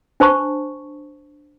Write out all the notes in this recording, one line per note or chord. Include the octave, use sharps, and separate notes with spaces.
D4 C5 A5 C#6